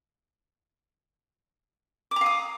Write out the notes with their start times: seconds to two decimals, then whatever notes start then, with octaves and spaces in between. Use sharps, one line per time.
2.11 D6
2.16 A#5
2.21 F5
2.26 D#6